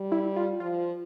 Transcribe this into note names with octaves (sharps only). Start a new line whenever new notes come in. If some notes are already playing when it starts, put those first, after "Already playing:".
Already playing: G3
E4
F4
F3 F4